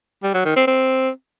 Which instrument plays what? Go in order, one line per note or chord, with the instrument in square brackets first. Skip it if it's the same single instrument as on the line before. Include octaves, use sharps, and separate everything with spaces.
[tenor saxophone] G3
F#3
D#3
C4
C4